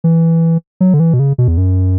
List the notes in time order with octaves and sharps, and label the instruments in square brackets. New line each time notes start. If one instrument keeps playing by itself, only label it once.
[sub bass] E3
F#3
D3
E3
B2
C#3
B2
E2
F#2